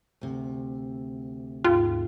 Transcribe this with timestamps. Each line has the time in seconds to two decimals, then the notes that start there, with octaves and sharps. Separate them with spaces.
0.21 D2 C3
1.65 D#2 G#2 F4